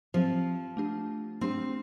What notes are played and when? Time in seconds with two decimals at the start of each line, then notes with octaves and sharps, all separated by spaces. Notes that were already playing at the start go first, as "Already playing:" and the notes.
0.14 F3 C4 G4 C5
0.77 A3 D4 G4
1.41 A3 C4 D4 G4